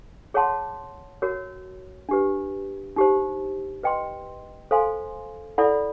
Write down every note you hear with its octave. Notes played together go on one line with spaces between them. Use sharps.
G#4 C#5 F#5 A5 C6
F#4 A#4 C#5
D4 G4 B4
D#4 G4 C5
B4 D#5 G5 C6
A4 C5 F5 G#5 C6
E4 A4 D5 F#5 B5